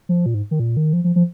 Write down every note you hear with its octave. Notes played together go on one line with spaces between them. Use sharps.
F3
A#2
G#2
D#3
A#2
D#3
F3
F3
F3